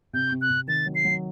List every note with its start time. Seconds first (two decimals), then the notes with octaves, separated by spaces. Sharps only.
0.13 C3 G6
0.32 C3
0.41 F#6
0.50 C3
0.68 D#3 A6
0.86 F#3
0.95 C7
1.05 F#3